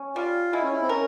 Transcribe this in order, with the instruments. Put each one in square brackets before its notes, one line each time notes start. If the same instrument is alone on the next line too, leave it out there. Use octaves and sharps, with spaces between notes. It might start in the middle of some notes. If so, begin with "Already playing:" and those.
Already playing: [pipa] C#4
[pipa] G3 [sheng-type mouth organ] F4
[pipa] G#3 [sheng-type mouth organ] E4
[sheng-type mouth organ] C#4
E4
C4
[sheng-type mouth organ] C#4 [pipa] A#4